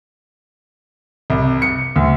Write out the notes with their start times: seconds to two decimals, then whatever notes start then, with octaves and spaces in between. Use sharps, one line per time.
1.30 C2
1.62 C#7
1.96 D2